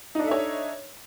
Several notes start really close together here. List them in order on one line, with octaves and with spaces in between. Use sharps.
D#4 D4 A4 E5 C#5